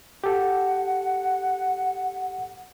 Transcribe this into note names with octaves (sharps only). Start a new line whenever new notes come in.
G4 A4 F#5